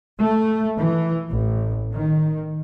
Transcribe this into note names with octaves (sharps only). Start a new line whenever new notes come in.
A3
E3
A1
D#3